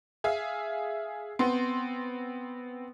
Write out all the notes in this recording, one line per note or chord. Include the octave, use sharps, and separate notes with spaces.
G#4 E5 F5
B3 C4 C6